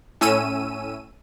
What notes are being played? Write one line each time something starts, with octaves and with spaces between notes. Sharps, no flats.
A2 C#4 E6 D#7